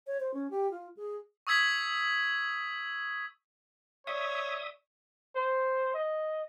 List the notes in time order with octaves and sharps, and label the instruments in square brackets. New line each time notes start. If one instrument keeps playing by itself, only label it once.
[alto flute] C#5
C5
C#4
G4
F4
G#4
[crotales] C#6 D#6 E6 G#6 B6 F#7
[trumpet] C#5 [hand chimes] D5 C#6 [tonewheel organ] E5 D#6
[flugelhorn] C5
D#5